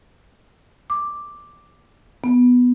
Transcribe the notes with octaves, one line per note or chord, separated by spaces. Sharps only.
D6
B3